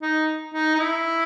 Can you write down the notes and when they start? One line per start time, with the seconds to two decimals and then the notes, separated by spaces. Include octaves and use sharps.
0.02 D#4
0.54 D#4
0.75 D#4
0.79 E4